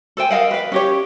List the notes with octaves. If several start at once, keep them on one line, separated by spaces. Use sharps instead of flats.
A4 C5 G5 G#5
A#4 D#5 F5 F#5
B4 F5
C#4 G4 C#5